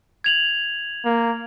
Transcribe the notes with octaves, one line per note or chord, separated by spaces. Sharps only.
G#6 F7 F#7
A#3